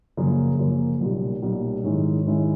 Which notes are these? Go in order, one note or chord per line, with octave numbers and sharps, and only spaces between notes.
F#2 C#3 F3 A#3
F#2 C#3 F3 A#3
B1 A#2 G3
B1 A#2 G3
G#2 D#3 G#3 C#4 E4
G#2 D#3 G#3 C#4 E4